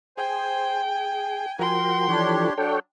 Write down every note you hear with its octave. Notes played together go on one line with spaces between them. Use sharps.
G#4 C5 G5 G#5
G#5
F3 F#4 A#4 G5 C6
E3 F3 D4 G4 A4 C#5
F#3 D4 A4 C#5 G5